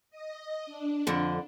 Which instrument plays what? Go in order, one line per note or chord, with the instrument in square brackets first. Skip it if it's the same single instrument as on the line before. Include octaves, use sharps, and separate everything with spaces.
[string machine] D#5
D4
[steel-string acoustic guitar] F2 D3